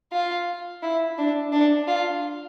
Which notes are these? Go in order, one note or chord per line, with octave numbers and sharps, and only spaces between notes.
F4
E4
D4
D4
F4